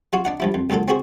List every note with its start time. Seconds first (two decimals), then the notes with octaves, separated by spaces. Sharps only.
0.13 F#3 F4 F#4
0.25 D4 D#4 F#5
0.40 G2 F3 E4
0.54 F2
0.70 C#2 A#2 D3 F#3 A4
0.88 C4 C#4 F#4 G#4 C5